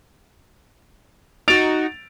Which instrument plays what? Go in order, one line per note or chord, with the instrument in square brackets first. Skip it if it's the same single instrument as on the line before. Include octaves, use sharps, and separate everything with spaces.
[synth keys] D#4 F#4 [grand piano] A6 D7 F7